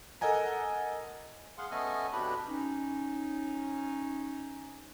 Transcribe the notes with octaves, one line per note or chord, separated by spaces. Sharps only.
A4 A#4 D#5 F#5 G#5 A#5
G#4 F5 F#5 C6
A3 B3 C#4 A4 D#5 G#5
F2 B2 D4 G4 B4 B5
C#4 D#4